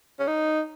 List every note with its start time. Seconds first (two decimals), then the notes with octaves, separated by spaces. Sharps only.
0.19 C#4
0.27 D#4